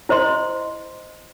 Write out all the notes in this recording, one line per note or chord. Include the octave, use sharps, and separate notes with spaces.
E4 C5 D#5 C6